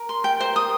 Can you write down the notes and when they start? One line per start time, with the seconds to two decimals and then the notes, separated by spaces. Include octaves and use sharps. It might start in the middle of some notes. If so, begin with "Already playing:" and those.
Already playing: A#4
0.09 C6
0.24 G5
0.40 C5
0.56 D#6